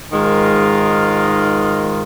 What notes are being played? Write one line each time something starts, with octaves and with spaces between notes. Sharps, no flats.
G#2 D#3 G#3 F4 A#4